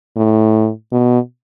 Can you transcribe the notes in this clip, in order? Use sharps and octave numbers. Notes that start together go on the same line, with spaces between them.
A2
B2